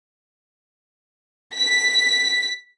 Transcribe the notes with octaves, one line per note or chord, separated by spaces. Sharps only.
B6